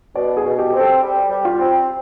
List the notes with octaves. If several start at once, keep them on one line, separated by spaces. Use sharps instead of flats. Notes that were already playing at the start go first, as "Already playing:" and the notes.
B2 D5
G#4
B2
G4
C4
A4
G3
G3
F4
C4